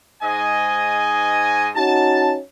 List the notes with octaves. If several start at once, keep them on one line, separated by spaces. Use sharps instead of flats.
G#2 D#5 G#5
C#4 D#4 F#4 A5